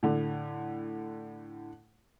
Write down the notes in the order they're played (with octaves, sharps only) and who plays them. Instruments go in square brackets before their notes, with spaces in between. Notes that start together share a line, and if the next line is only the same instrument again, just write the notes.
[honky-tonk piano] A2 D3